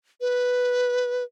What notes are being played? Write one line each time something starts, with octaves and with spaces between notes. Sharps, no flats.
B4